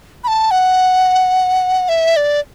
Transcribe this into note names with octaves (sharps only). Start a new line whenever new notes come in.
B5
A5
F#5
E5
D5